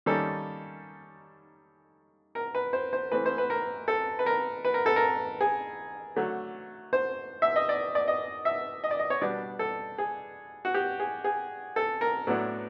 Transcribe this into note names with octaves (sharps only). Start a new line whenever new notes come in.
D#3 G3 A#3 C#4 A4
A#4
B4
C5
C5
E3 A3 C4 B4
C5
B4
A#4
A4
B4
A#4
B4
A#4
A4
A#4
G#4
D3 F#3 A3
C5
E5
D#5
D5
D5
D#5
E5
D#5
D5
D#5
C#5
B2 G3 B3 D4 D5
A4
G#4
F#4
G4
G#4
G#4
A4
A#4
A2 F#3 B3 D4